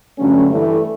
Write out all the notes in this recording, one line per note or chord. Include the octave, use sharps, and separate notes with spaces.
G2 D3 F#3 A3 C#4
G2 E3 A3